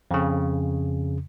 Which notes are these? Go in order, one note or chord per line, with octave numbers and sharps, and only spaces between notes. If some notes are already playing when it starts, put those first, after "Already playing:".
F2 C#3